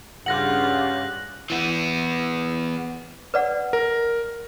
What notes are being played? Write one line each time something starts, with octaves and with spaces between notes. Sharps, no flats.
G2 C#3 F4 G4 F#5 F#6 A#6 F#7
E3 B3
B4 D5 F#5
A#4